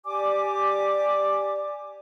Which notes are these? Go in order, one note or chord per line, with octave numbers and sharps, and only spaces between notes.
G4 D5 G#5 D6